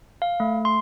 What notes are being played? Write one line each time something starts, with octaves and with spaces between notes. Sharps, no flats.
F5
A3
C6